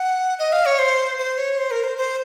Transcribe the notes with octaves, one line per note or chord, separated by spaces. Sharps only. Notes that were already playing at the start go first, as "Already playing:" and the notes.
Already playing: F#5
D#5
F5
C#5
C5
C5
C#5
C5
A#4
C5
C5